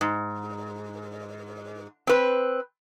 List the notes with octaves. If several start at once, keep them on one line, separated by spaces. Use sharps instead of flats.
G#2
C4 B4